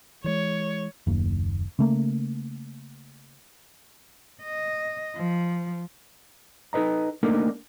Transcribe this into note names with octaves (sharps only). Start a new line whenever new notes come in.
E3 G#3 C#5
F#1 D#2
C#3 A3 A#3
D#5
F3
D#4 A4 B4 D#5 A#5
A3 A#3 D4 D#4 A4 A#4